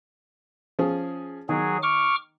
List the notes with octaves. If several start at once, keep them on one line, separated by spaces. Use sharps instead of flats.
F3 C#4 G#4
D#3 F#3 G#4
C#6 D6 F6